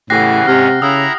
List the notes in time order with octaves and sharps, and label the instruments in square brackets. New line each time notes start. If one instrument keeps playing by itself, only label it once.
[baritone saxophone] A2 [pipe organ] C#3 E3 [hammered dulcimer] G4 F#5 [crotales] F#6 A#6 C7
[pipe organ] G#2 C#4 [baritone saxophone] C3 [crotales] F6
[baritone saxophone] C#3 [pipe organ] E4 A#5 [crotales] D#6 E6